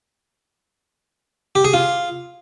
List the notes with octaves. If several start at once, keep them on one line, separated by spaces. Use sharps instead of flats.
G4
G#4
F4